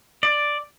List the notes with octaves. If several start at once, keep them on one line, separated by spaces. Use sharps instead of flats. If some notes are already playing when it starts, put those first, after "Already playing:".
D5